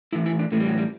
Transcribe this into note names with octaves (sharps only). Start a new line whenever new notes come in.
A2 E3 E4
E4
D4
A2 E3 A3
G3
F#3
G3